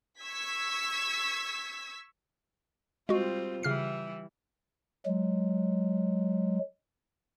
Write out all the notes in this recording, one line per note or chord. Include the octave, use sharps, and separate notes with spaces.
C#6 E6 G#6 B6
G3 G#3 C4 F4 F#4
C#3 E3 G3 E4 F6 C7
F#3 G#3